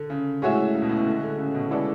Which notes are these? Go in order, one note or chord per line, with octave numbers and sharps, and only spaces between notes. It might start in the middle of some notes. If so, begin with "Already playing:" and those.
Already playing: D3
C#3
A2 G#3 C#4 F#4 C#5 E5
C#3
B2
A2
B2
D3
D3
C#3
B2
G#3 B3 E4 A4 D5